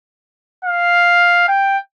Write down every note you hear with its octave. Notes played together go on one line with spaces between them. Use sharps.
F5
G5